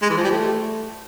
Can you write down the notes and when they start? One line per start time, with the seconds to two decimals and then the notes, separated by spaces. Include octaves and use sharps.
0.02 G#3
0.10 E3
0.17 F3
0.24 G3
0.31 A3